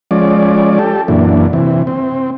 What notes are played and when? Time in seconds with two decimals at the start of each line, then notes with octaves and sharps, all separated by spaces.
0.11 F3 G#3 C#4 D5
0.79 G4 A4
1.08 F#2 A#2 E3 D4
1.53 C3 E3
1.87 C4